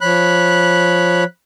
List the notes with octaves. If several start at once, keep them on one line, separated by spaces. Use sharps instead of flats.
F3 C#5 B5 F#6